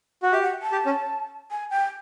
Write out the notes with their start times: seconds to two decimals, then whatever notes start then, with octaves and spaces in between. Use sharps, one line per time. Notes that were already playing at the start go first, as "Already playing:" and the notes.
0.23 F#4
0.32 G4 E5
0.43 F#5
0.62 A5
0.72 G4
0.86 C#4
1.51 G#5
1.70 G5